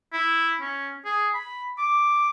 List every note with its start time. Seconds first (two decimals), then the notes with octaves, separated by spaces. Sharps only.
0.13 E4
0.61 C#4
1.05 G#4
1.34 B5
1.78 D6